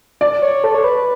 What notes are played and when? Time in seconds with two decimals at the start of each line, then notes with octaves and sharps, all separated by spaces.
0.21 D5
0.42 C#5
0.64 A4
0.75 C#5
0.84 B4